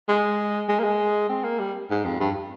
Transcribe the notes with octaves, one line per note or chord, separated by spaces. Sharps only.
G#3
G#3
A#3
G#3
C4
A#3
G3
G#2
F2
G2